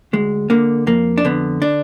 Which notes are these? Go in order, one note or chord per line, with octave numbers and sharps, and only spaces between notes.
D2 G#3
D3 A#3
F2 A#3
D4
D3 B3
D4